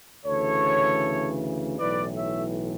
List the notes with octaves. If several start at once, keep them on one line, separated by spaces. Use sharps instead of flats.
D2 C#3 E3 A4 C#5
B1 A2 E3 B4 D5
C#5 E5